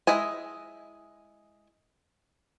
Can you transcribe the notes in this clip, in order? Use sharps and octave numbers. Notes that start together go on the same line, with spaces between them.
G#3 E4 D#5 G#5